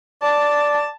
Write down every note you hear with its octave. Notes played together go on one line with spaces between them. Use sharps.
D5 A5